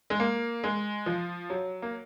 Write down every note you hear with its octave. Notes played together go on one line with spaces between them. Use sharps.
G#3
A#3
G#3
F3
F#3
A#3